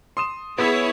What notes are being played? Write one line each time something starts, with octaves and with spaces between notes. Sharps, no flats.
C6 D#6 E7
B3 E4 G#4 C#5